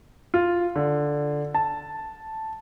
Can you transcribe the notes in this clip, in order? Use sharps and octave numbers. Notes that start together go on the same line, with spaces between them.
F4
D3
A5